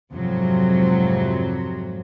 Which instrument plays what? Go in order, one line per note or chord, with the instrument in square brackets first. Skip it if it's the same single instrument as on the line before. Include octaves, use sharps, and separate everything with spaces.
[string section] F2 G#2 C3 F#3